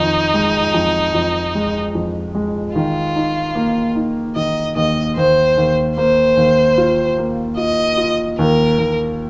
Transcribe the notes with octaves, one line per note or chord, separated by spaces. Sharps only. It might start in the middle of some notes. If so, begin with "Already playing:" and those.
Already playing: F2 D#3 D#4
G#3
F2
F2
G#3
F2
G#3
D#3 F4
D#4
A#3
D#4
D#3 D#5
D#2 D#5
D#2 C5
D#2
A#3 C5
D#2
F4
A#3
F4 D#5
F4
D#2 A#4
D#2